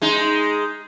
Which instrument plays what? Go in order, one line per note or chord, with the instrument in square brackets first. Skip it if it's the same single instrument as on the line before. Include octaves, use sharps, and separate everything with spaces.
[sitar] G#3 D#4